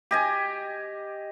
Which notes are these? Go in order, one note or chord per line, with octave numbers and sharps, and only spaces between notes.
G4 D#5 G#5